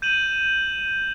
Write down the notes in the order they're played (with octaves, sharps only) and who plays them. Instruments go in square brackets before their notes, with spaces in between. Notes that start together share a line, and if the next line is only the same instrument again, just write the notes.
[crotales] G6 D#7 E7 F#7